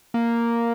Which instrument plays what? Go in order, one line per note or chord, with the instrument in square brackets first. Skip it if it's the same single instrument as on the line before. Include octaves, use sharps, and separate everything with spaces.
[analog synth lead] A#3